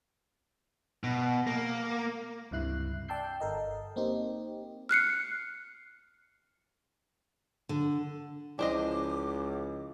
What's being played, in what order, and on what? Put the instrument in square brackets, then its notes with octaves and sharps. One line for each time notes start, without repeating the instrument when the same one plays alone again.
[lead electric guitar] B2
A#3
[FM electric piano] C#2 G2 C3 E4 F#6 C7
D5 G5 A5 E6 G6 C7
G1 A4 A#4 D#5
A#3 C4 D#4 G4
[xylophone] F6 F#6 C7 C#7
[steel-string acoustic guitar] D3
[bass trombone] C#2 [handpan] F3 C#4 E4 [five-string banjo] D4 C5 D#5 [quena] D6